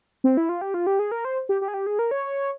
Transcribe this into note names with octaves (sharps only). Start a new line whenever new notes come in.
C4
E4
F4
G4
F4
G4
G#4
A#4
C5
G4
G4
G#4
G4
G#4
A#4
C#5